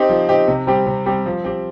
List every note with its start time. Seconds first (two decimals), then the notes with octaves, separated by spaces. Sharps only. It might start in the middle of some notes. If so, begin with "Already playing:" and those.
Already playing: C4 D#4 G4
0.09 F3
0.29 C4 D#4 G4
0.48 C3
0.67 G3 C4 G4
0.86 C3
1.06 G3 C4 G4
1.26 F3
1.44 C4 G4